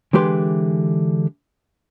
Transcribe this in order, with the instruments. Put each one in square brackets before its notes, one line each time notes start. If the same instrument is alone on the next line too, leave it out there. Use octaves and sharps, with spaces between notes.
[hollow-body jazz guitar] D3 E3 G#3 G4 B4 C6